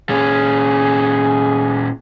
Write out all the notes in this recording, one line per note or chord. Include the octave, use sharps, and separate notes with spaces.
A#2 C#4 G#4